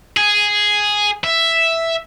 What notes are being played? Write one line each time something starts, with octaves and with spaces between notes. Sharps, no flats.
G#4
E5